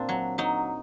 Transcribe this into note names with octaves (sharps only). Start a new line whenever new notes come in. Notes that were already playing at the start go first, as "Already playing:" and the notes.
Already playing: A#2 A#3 C4 D4
F#3
F#3 D#4